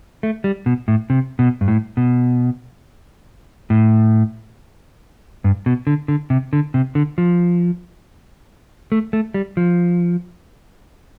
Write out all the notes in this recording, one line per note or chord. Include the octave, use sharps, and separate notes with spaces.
A3
G3
B2
A2
C3
B2
G2
A2
B2
A2
G2
B2
D3
D3
C3
D3
C3
D3
F3
A3
A3
G3
F3